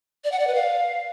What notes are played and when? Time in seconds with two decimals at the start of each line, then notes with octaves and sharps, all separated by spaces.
0.24 D5
0.32 F#5
0.39 D5
0.47 B4
0.55 F5